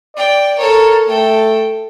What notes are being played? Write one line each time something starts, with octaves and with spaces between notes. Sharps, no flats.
D5 G5
A4 A#4 C#5
A3 A4 G5